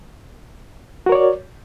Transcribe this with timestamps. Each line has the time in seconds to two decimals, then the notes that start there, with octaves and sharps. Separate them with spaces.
1.06 F#4
1.09 A#4
1.12 C#5
1.15 D5